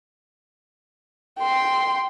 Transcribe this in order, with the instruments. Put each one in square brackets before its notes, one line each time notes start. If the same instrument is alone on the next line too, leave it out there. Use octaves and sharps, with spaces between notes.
[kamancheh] G5 C6